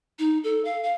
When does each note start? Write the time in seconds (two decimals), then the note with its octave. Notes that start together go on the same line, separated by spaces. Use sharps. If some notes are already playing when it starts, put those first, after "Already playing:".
0.19 D#4
0.44 A4
0.65 F5
0.83 F5